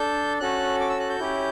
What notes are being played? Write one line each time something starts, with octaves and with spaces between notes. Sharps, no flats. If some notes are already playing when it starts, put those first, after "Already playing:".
Already playing: D4 A4 G6
C#4 F#4 A4 F#6
D6
E6
F#6
G6
C#4 E4 G4